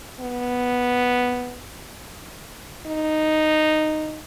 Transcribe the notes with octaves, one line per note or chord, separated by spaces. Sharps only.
B3
D#4